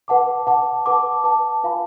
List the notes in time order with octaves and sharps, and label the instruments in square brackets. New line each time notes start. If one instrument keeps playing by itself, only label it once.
[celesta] B4 F#5 A5 D6
B4 F#5 A5 D6
B4 F#5 A5 D6
B4 F#5 A5 D6
F4 B4 F5 G#5 B5